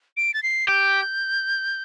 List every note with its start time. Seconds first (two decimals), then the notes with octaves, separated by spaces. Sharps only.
0.17 D7
0.34 A6
0.43 C7
0.68 G4 G6